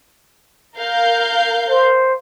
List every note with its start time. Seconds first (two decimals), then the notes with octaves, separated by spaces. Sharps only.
0.79 A#4 F5 G6
1.70 C5